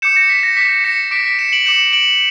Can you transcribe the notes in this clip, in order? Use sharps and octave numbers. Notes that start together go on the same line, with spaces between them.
D6 G6 C#7 E7
A#6 C#7
B6
A#6
D6 G6 B6
A#6 C#7
D6 G6 B6 D7
B6 D7
C#7 E7
D7 F#7
D6 G6 C#7 E7
D7 F#7